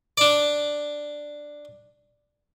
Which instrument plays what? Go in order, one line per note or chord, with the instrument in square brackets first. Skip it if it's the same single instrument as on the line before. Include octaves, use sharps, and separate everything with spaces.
[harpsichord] D4 D5